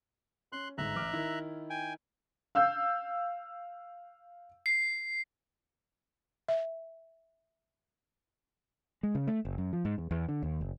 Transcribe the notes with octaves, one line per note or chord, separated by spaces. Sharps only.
C#4 C6 F#6
G1 G#2 E5 A#5 F#6
A1 D6 F6
D#3 E4
G5 G#5
F5 E6 G6
C7
E5
G#3
C#3
A3
F#1
F#2
F3
G#2
E2
E2
D3
D#2
F#1